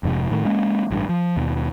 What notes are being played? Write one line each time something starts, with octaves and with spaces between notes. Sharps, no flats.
F1 F2 G#2 C3
A2 D#3
G#3 A#3 C#4
A1 G2
F3
D#2 B2